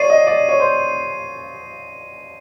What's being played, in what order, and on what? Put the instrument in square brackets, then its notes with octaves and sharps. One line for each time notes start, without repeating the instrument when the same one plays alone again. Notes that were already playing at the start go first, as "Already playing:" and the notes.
Already playing: [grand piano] C#5 D5 [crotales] C7 D#7
[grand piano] D#5
D5
C#5
C5